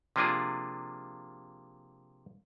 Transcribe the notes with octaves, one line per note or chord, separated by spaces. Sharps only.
C3 F3 A#3 D4 F4 G#4